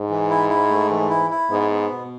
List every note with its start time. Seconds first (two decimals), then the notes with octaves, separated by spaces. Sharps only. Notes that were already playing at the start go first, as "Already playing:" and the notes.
Already playing: G#2
0.10 E3
0.30 E4
0.49 E4
0.70 A3
0.90 E3
1.10 E4
1.30 E4
1.51 G#2 B3
1.71 B3
1.91 B2